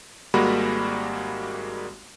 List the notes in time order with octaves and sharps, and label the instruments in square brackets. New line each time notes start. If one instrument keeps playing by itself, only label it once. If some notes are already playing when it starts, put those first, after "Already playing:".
[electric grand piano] G#1 G3 G#3 A#3 F#4 B5